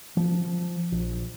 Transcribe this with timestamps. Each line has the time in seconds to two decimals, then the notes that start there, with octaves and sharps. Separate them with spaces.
0.17 F3
0.92 A#1